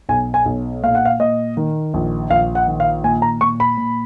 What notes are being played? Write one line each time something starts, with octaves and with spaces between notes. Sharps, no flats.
B1 G#5
G#5
B1
A#2 F5
F#5
F5
A#2 D#5
D#3
A#1
A#1 F5
F#5
D#3
F5
A#2 G#5
A#5
A#2 C#6
B5
A#2